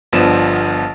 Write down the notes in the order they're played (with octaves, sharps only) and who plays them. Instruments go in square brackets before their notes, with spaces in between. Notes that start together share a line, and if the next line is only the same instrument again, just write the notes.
[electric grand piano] G1 F3 B3 D4 E7